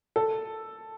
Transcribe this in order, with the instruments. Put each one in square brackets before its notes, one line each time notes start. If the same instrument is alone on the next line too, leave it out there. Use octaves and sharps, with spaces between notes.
[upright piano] A4